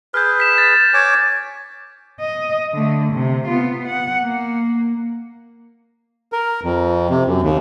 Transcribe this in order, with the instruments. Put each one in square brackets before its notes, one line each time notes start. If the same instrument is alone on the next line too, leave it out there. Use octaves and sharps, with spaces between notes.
[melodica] G#4 B4 [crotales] F6 G6
[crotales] B6 E7
A6
[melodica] C#5 G#5 D6
[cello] D#5
D3 A3
C3
B3 F4
F#5
A#3
[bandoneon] A#4
F2
C3
F#2
D#2